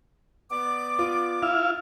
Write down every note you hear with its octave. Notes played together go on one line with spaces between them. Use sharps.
B3 D5 D6
F4
E4 F5